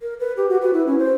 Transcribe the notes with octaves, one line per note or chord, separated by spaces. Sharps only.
A#4
B4
G4
F#4
B4
E4
C#4
C5